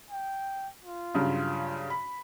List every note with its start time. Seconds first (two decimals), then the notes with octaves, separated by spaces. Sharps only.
0.11 G5
0.84 F4
1.14 G2 C#3 F#3
1.90 B5